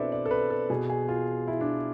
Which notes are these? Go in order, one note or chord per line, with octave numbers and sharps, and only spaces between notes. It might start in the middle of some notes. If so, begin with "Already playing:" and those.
Already playing: B2 C4 D4 E4 A4 B4 D5 E5
D5
A4
B4
A4
B2 G#4
G#4
F4
E4
D4